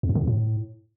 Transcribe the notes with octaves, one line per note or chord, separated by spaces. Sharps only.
F2
F#2
D3
F2
A2